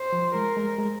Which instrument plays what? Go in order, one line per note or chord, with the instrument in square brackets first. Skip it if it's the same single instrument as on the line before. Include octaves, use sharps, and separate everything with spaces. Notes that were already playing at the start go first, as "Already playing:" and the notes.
Already playing: [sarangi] C5
[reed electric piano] F3
[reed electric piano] G#3 [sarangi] A#4
[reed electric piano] G#3
G#3